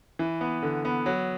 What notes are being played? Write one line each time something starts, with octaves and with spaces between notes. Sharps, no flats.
E3
B3
D3
B3
F#3